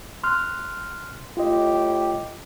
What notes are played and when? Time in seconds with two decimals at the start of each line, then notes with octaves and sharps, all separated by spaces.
0.24 C6 F6 F#6
1.37 A2 F4 G4 D#5